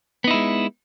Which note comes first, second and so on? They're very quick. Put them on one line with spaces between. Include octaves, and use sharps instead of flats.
B3 D#4 E4 G#3